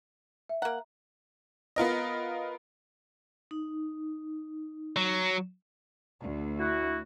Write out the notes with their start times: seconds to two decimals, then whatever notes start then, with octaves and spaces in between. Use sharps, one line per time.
0.49 E5
0.62 A#3 F#5 A#5
1.76 B3 F4 A#4 D#5
3.51 D#4
4.96 F#3
6.21 D2
6.58 E4 F#4